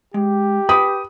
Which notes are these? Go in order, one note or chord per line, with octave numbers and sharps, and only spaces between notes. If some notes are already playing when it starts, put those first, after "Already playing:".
G#3 G4
B4 G5 B5 D#6